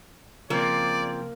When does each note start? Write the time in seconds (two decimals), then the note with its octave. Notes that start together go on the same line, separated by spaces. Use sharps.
0.50 C#3 F3 A#3 C4 D5